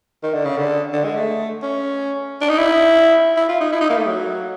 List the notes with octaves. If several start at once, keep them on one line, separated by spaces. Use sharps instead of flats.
D#3
D3
C#3
D3
D3
G#3
A3
C#4
D4
D#4
E4
E4
F4
D#4
E4
D#4
A#3
A3
F#3